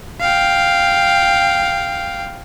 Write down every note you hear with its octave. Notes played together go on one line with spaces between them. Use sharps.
F5 G5